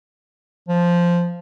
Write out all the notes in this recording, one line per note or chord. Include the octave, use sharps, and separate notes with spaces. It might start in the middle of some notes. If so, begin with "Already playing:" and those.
F3